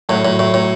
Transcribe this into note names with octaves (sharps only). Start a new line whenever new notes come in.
A2 F#3
A2
A2
A2